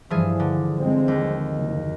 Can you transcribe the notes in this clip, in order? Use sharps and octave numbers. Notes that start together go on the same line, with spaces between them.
G2 E3 F3 G#4
D3
G2 G#3 C4
D#2
F#1